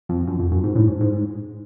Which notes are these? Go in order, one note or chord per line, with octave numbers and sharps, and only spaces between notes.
F2
F#2
F2
F#2
G#2
A2
G#2
G#2